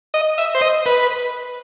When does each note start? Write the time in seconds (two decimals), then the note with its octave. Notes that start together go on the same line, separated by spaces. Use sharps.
0.14 D#5
0.38 E5
0.55 C5
0.61 D#5
0.86 B4